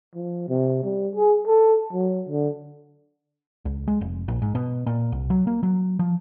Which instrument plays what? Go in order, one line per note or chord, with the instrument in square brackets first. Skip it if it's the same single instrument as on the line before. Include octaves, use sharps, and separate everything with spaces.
[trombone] F3
C3
G3
G#4
A4
F#3
D3
[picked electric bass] C#2
G#3
F1
A#1
G#2
B2
A#2
C2
F#3
A#3
F#3
F3